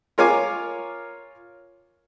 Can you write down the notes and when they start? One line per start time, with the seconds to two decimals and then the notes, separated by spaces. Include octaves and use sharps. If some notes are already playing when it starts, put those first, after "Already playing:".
0.18 F4 A#4 C#5 F5 G#5 D6